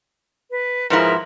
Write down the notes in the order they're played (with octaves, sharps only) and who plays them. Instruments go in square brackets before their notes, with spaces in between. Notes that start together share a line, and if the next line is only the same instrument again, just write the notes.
[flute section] B4
[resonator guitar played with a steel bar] G#2 F3 E4 [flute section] G#4 A#4 B4